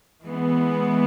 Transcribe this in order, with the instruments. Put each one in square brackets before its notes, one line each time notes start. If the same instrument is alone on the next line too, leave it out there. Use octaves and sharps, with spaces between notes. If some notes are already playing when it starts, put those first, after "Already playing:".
[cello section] E3 G#3 B3